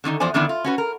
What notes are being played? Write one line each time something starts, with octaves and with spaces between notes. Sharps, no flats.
D3 D#3 C#4 D#4
E2 F3 C5 D5 G#5
F2 D3 D#3 B3 D4 E4
F4
C#4 F#4 B4
A#4